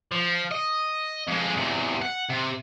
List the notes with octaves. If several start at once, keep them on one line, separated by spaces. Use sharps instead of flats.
F3
D#5
F2 G#3
E2 C3
F#5
C3